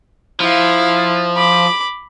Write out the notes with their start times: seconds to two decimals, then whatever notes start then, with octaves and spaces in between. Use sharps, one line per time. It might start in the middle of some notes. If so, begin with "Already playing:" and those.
0.40 F3 E4 F5
1.37 B5 D6